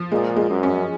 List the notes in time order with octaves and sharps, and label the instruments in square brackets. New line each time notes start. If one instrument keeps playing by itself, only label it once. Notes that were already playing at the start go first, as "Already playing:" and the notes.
Already playing: [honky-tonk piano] F3
[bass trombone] A#2 [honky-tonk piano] G#3
[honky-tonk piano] G#3
[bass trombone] F#2
[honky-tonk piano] C#4